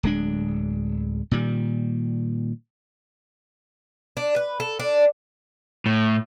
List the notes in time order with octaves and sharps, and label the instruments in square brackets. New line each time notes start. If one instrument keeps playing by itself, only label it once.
[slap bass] D1 G#3 D4
A#2 D#3 G3
[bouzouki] D4
B4
A4
D4
[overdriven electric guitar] A2